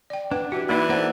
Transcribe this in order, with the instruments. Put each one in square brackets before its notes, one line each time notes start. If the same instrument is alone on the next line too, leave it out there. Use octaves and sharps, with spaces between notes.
[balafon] D5 G5
[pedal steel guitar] D4 [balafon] B4 F#5
[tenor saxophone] E3 [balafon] F#4 [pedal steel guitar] G4
[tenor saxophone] E3 [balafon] A#3 D#4 [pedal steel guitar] E4 D5 B5
[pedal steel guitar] A#3 A4 [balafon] C5 D5 F#5